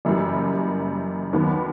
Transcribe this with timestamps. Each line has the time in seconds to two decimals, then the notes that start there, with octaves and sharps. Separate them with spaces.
0.05 F#1 F#2 E3 G3
1.33 D#2 D#3 F#3 B3